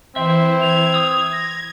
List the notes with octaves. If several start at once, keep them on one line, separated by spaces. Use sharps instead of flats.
E3 C4 E4 E5
G#6 F7
D#6 E6
A#6